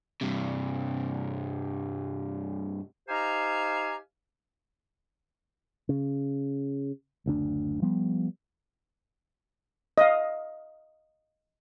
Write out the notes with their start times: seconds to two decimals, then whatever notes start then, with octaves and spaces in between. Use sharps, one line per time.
0.21 G2 C3
3.08 D#4 G4 C5 F5 G#5 A#5
5.89 C#3
7.26 F#1 D2 D4
7.82 F3 G3 B3
9.98 D#5 F5